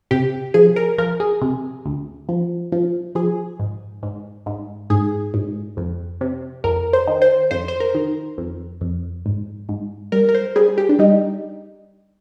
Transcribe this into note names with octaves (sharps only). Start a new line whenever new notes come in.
C3 G4
F3 G#4
A#4
F3 A#4
G#4
C3
D2
F3
F3
F3 G#4
G#2
G#2
G#2
G#2 G#4
G#2
F2
C3
F2 A#4
C5
D#3
C5
F2 C5
C5
A#4
D#3
F2
F2
G#2
G#2
G3 A#4
A#4
C5
G3 G#4
G4
D4
G3 D#4